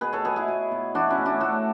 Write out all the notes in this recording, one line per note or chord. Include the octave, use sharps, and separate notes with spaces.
B2 G#4 B4
A4 C#5
B2 G#4 B4
E4 G#4
B2
B2
E3 D4 F#4
C#4 E4
A2
D4 F#4
A2 F#4 A4